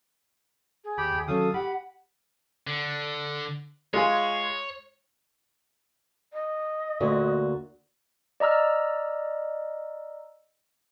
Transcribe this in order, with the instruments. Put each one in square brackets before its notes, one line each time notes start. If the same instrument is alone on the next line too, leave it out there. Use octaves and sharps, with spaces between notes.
[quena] G#4
[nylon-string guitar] D#2 [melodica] G4 G5 B5
[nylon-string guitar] D#2
[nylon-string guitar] D#3 F#3 C#4 [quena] A4 [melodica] F5 D#6
[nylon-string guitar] G4 [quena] F#5 [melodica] B5
[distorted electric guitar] D3
[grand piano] G#3 F4 G#4 [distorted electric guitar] C#5
[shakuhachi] D#5
[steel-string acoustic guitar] D2 A#2 F#4
[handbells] D5 D#5 A#5 E6 F6